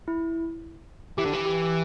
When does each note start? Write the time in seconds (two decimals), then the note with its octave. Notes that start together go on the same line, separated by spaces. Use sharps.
0.08 E4
1.18 E3 G4
1.26 D3
1.33 E3
1.46 G4